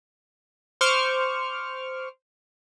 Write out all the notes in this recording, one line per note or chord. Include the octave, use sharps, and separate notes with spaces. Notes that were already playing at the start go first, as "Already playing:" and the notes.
C5 C#6 D6 F6